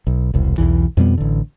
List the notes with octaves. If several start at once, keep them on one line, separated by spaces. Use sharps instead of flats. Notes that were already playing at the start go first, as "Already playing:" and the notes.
B1
E1 C2
B1 E2 E3
F2 B2 G3 B3
A1 D3